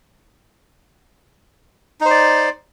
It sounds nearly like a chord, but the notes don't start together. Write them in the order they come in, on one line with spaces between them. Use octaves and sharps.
D#4 C5 D5